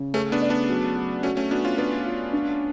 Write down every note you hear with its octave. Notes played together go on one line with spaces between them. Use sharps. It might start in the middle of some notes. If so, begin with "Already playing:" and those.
Already playing: C#3
A3 C#4 G#4
B3 D4
D5
B3 D4
F#3
F#3
A3 C#4 F#4
A3 C#4
B3 D4 F#4
C#4 F4
B3 D4 B4
F4
D4